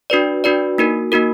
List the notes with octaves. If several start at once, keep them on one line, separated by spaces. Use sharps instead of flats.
D4 F#4 B4 D5
D4 F#4 B4 D5
A#3 D#4 F#4 A#4
A#3 D#4 F#4 A#4